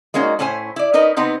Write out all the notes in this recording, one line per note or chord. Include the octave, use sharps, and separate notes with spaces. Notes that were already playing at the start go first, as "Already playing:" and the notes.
G#3 A#3 C#4 D#4 F#4
A2 C#4 E4 C5 G#5
E4 D5
C#4 D#4 A#4 B4 D#5
C3 B3 C4 D#4 B4